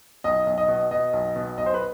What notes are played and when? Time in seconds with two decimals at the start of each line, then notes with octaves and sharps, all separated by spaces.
0.24 B1 D#5
0.47 B1
0.58 D#5
0.68 B2
0.91 B2 D#5
1.13 B1
1.36 B2
1.58 B1 D#5
1.66 C5
1.74 B4